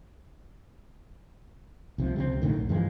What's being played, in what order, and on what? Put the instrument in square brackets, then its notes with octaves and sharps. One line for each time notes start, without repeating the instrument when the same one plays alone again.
[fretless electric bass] C2 C3 F3
C#2 C3 F#3 C4
A#1 A2 D3 D#3
B1
G2 E3 F3 G#3